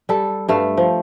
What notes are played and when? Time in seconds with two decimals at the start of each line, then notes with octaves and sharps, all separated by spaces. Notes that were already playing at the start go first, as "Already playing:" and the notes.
0.09 G3 A4
0.48 G2 A3 A4 F5
0.77 F3